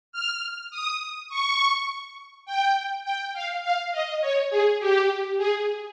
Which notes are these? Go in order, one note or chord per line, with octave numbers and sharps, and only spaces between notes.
F6
D#6
C#6
G5
G5
F5
F5
D#5
C#5
G#4
G4
G#4